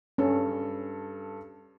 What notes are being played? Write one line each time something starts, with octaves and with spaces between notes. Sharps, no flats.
G2 C#4 A4